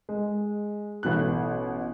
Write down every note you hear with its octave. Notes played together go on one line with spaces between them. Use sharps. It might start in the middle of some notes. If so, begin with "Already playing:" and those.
G#3
A1 B2 F#6